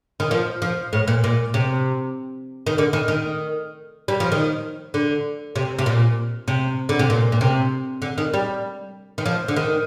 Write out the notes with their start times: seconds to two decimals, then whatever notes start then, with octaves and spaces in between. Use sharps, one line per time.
0.20 D#3
0.31 F3
0.62 F3
0.93 A2
1.08 A#2
1.24 A#2
1.54 C3
2.67 D#3
2.78 D3
2.93 D#3
3.08 D#3
4.08 G3
4.20 F3
4.32 D#3
4.94 D3
5.56 C3
5.79 C3
5.86 A#2
6.48 C3
6.89 D3
6.99 C3
7.10 A#2
7.32 A#2
7.41 C3
8.02 D3
8.18 D#3
8.34 G3
9.18 D#3
9.26 F3
9.48 D3
9.56 D#3